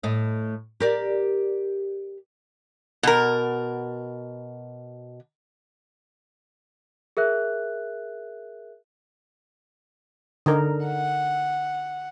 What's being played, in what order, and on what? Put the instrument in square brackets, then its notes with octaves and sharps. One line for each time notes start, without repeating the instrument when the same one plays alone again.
[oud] A2 D#5
G4 A#4 D5
[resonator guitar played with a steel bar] B2 A#4
[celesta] G#4 A#4 E5 F#6
[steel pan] D3 D#4 A#4
[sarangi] F#5